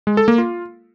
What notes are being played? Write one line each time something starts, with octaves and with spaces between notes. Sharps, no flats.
G#3
A4
A#3
F4